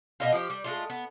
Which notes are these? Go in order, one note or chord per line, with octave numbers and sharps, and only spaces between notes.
B2 D#5 F5
F3 G4
G3
G#3 A3 F4
B3